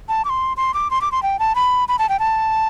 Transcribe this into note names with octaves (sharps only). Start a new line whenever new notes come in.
A5
D6
C6
C6
D6
C6
D6
C6
G5
A5
B5
B5
A5
G5
A5